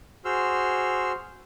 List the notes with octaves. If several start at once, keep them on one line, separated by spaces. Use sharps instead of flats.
F#4 G#4 C5 C6 E6 F6